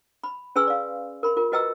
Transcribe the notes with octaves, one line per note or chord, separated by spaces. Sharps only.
B5
C#4 G#4 B4 G#5 C6 E6
D5 F5
A#4 B5 C6
F4 A#4
F#4 B4 D#5 G5 A#5 E6